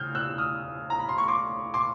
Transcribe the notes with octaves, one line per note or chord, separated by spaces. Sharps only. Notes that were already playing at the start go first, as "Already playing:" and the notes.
Already playing: C#3 F6 G6
E6 F#6
D#6 F6
A#5
B5
C6
C#6
C6 D6
C6 D6